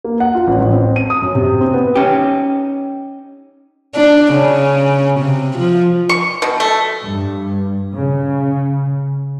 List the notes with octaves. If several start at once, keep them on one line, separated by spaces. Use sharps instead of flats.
A#3
F#5
F4
A1
A1
C4
D#7
D#6
F#2
C3
C4
B3
C#4 D#4 G4
D4
C#3
C3
F3
C#6
B2
A3
G2
C#3